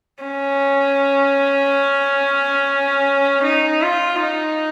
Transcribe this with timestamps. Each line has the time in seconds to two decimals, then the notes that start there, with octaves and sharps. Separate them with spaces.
0.24 C#4
3.43 D#4
3.82 F4
4.22 D#4